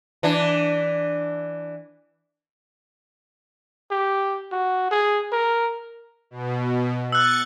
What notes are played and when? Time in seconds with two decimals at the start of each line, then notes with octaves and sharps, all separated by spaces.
0.23 E3 D4
3.91 G4
4.52 F#4
4.91 G#4
5.32 A#4
6.31 B2
7.12 E6 F#6 A6 C#7